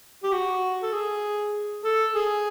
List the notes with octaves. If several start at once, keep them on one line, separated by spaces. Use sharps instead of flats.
G4
F#4
A4
G#4
A4
G#4